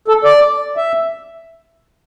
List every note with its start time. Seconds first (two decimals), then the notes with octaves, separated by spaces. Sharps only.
0.08 A4
0.24 D5
0.77 E5